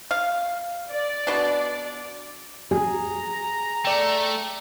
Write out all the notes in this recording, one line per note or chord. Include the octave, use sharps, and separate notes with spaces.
F5
D5
B2 D4
G#4 A#5
A3 D5 G5